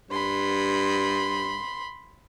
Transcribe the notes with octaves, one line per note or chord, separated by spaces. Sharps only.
G2 B5 C6